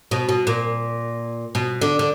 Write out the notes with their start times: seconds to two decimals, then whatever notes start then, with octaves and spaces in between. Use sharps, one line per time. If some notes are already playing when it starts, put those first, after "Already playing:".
0.11 B2
0.29 B2
0.47 A#2
1.55 B2
1.82 D3
1.99 D3